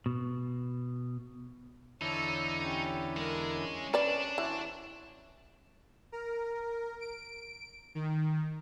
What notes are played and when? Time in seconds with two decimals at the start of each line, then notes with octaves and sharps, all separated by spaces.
0.06 B2
2.01 E2 D3 D#4 E4 A4 C#5
2.60 C#4 G4
3.17 G#3 A#4
3.56 C#4
3.94 D4 B4 D5
4.38 E3 F#4 C5 C#5
6.12 A#4
7.00 D7
7.95 D#3